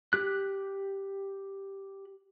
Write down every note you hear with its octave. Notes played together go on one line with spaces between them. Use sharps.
G4 F#6